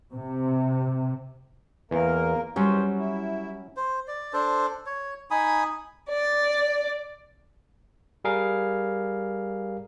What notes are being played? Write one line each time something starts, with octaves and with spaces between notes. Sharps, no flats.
C3
E2 A#3 A#4
E2 F#3 G3 C#4 C5
E4
C5
D5
D4 A4 C5
C#5
D#4 G#5 B5 D#6
D5
G3 G#4 A#4 F5